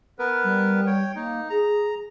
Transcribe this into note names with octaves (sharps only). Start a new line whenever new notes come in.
B3 A#4 B4
G3
C#5 G5
A#3 D#4
G#4 A#5